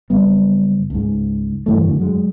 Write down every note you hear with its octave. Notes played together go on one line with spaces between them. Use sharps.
F#1 G3 B3
C#2 G#2
G2 E3 A3
F#2 D3
F#3 G#3